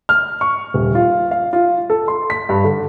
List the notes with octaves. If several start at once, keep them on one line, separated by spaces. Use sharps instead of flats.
F6
C#6
D#1
F4
F5
F4
A4
C6
B6
G2
D3